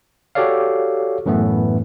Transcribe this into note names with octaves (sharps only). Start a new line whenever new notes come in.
F#4 G4 A4 C#5 D5 F5
F#2 A2 E3 A3 B3